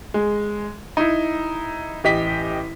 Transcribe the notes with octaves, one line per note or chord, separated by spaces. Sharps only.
G#3
D#4 E4
A1 G4 D#5 B6